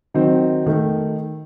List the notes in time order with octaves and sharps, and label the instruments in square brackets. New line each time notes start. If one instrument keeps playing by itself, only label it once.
[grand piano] D#3 F#3 C4 D#4
D#3 A3